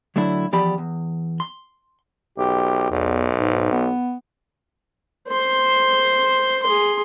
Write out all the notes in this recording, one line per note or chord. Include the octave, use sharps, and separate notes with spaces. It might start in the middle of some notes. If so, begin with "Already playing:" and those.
D3 F#3 A3 D4 E4
E2 F3 G4 D5 B5
E2
C6
B1 G4
B1 E2
G#2
B3
C5 C6
G#4 C6